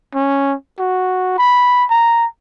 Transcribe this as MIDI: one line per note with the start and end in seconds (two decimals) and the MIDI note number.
0.15 0.55 61
0.79 1.37 66
1.38 1.85 83
1.91 2.26 82